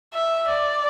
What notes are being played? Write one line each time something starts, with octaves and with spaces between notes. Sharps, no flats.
E5
D5